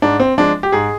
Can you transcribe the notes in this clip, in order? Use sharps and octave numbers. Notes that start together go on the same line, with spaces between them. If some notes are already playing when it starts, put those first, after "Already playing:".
G#2 D4
C4
F3 G#3 D4
G4
G#2 G#4